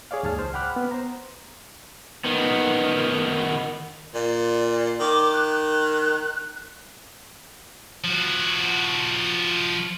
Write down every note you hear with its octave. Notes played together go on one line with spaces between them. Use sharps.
G#4 C#5 D5 F5
D#2 G#2 G#4 A5 F6
C#2 C5
F#5 G5 B5 D6 F6 F#6
B3
C5 A#5
D#3 B3
A#2 D5
D#3 D6
F#6
F3 F#4